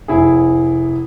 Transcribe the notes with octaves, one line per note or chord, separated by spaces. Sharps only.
F1 E4 G#4